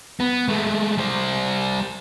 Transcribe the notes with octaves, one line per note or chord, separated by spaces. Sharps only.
B3
G#3 A3
G3 C5